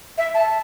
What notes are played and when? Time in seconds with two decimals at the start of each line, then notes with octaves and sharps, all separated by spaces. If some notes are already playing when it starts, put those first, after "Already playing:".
0.18 E5
0.34 A5